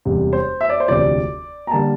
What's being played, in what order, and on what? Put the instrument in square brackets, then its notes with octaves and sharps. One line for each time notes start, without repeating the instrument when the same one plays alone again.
[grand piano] E1 E2 C3 G3
[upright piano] C5
E5
D5
C5
[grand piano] E1 D2 C3 F3 [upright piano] D5
[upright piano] A#5
[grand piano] D3 G3 A#3 [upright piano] A5